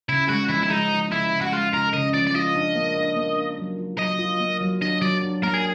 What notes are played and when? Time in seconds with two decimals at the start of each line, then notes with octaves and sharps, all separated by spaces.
0.09 C#3 E4
0.29 G#3 F#4
0.50 F3 E4
0.63 E4
0.70 G#3 D#4
0.90 F3
1.11 C#3 E4
1.31 C#3
1.41 F#4
1.52 G#3 F4
1.73 C#3 A#4
1.93 C#3 D#5
2.14 F3 D5
2.27 D5
2.35 F4 D#5
2.56 D4
2.75 A#3
2.97 D4
3.17 A#3
3.37 D4
3.58 F#3
3.78 F4
3.99 F#3 D#5
4.19 F4
4.40 A#3
4.61 F#3
4.82 D4 D#5
5.01 F#3 D5
5.23 D4
5.43 A#3 A#4
5.54 G#4